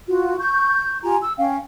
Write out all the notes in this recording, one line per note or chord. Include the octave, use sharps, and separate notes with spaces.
F4 F#4
C#6 G6
F4 G4 G#5 A#5
E6
C#4 F5 G5